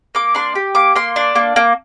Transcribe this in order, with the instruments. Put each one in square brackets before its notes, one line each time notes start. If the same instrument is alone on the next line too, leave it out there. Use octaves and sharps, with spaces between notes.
[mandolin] A#3 D6
D4 C6
G4
A#3 D6
A#3 C6
D4
A#3
A#3